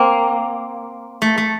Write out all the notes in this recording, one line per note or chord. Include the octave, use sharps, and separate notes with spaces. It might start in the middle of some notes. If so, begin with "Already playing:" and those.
Already playing: A#3 C4
A3
A3